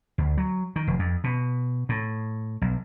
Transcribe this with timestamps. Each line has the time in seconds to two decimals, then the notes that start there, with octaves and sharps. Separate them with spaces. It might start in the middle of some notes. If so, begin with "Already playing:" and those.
0.18 D2
0.38 F#3
0.76 D#3
0.87 F1
0.99 F2
1.24 B2
1.89 A2
2.62 B1